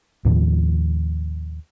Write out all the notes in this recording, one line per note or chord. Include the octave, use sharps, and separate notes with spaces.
D#2 A2 D#3 F3